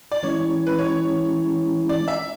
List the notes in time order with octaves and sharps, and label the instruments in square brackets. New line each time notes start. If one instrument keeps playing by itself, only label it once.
[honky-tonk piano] D5
[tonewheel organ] E3 G#3 C#4 E4 [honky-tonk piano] C#5
[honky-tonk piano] B4
C#5
D5
E5